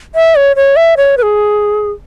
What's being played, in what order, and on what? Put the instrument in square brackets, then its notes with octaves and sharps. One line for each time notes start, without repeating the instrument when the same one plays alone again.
[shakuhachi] E5
C#5
C#5
E5
C#5
B4
G#4